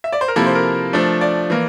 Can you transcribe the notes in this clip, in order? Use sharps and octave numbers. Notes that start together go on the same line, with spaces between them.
E5
D5
C5
A#4
C3 F3 A#3 E4 A4
C5
A#4
F3 A3 D4
D5
E3 A#3